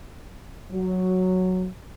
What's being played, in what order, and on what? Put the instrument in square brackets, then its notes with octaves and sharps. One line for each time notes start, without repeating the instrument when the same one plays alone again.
[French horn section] F#3